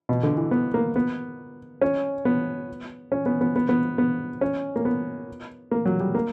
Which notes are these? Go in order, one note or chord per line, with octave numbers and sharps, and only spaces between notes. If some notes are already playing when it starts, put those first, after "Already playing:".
B2
D3
E3
B3
A#3
B3
C#4
B3
C#4
B3
B3
B3
B3
B3
C#4
A#3
B3
A#3
F#3
G3
A#3